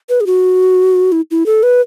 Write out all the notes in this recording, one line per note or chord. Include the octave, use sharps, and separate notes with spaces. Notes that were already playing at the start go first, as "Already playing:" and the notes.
B4
G#4
F#4
E4
E4
A4
B4